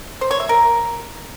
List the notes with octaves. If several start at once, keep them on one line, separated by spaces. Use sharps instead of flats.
C5
C#5
E5
A#4